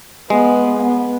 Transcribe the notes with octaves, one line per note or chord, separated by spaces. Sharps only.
G#3 B3
B3